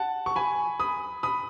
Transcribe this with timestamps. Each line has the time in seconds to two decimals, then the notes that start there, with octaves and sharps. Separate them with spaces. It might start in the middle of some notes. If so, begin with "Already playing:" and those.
Already playing: F#5 A5
0.26 C#6
0.36 G#5 B5
0.80 B5 D#6
1.23 B5 D#6